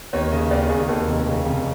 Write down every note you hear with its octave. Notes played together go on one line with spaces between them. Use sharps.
D#2 C#5
C#3 D#5
D#2 D5
D#2 G#4
D#2 A4
F1
C#3
F1